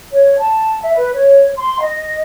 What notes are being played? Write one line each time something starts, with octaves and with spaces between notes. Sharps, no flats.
C#5
A5
E5
B4
C#5
C6
D#5